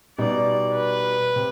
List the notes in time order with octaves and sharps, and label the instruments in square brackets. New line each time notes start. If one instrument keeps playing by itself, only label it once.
[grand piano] B2 G3 B3 D#4 [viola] D5
[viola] B4
[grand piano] C3